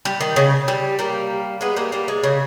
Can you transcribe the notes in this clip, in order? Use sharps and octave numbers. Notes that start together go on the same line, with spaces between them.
G3
D#3
C#3
G3
G3 A#3
G#3 B3
G3 A#3
G3 A#3
G#3
C#3